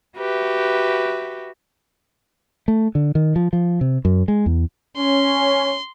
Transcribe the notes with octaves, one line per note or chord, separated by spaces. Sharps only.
F#4 G4 B4 E5
A3
D3
D#3
F3
F3
C3
F#2
G#3
E2
C#4 C6